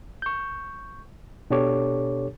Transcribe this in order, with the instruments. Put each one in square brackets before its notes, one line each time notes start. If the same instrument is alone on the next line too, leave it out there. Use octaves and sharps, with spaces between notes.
[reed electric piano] C#6 G6
B2 D4 G4 A4 C#5 D6